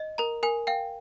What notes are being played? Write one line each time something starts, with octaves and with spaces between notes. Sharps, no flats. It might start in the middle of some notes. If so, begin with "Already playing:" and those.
Already playing: D#5
A#4 A#5
A#4 G#5
F5 G5